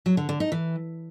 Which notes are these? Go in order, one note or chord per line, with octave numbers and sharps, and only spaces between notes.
F#3
D3
D3
D#4
E3